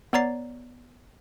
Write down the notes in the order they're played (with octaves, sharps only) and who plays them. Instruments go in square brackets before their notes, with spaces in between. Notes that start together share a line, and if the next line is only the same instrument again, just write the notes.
[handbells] B3 C#5 D5 A#5 A6 C7